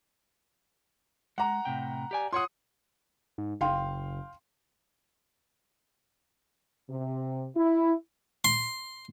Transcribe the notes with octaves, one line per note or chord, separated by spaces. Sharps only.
G#3 F#5 A#5
A2 C3 G5
G4 D5 G#5
F4 C#5 F#5 C6 D#6
G#2
F#1 F5 G5 C6
C3
E4
C6